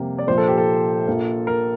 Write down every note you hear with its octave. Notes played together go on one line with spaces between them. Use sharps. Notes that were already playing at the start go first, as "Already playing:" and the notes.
Already playing: F2 C3 G3 A#3
D5
A#1 A#2 F3 A#3 C5
A4
G4
A4
A#1 A#2 F3 A#3
A#4